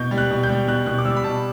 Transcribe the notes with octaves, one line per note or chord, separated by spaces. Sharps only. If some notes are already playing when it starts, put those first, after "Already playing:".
Already playing: B2 G6
G3
F#6
B2
G6
G3
B2 F#6
B2 F#6
D6
G3 E6
B5
B2 A5